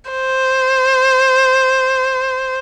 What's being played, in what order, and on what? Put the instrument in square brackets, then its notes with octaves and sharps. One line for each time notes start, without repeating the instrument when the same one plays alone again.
[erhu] C5